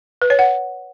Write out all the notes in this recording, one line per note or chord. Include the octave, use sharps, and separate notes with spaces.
B4
C#5
F#5